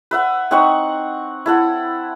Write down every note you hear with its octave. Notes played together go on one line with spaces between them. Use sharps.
B4 E5 F#5
C4 D#4 F#5 C#6
E4 A4 F#5